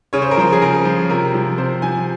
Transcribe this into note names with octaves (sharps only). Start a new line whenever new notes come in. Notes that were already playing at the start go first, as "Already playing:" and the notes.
C#3 C#5
C5
A#4
F3 C5
G#4
C#3 A#4
F3
C3 A#4
F3
C3 C5
F3 G#5